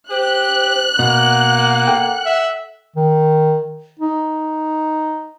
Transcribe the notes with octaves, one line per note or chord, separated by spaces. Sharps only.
G4 C5 F#6
B2 A#3 F#5
A4 G5
E5
D#3
D#4